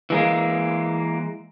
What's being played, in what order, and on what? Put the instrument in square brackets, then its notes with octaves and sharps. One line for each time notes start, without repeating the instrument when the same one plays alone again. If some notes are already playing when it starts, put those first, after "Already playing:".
[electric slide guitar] E3 G#3 A#3